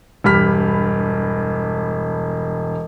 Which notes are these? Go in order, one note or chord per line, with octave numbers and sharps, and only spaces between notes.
E1 G2 G4 B5 F6 B6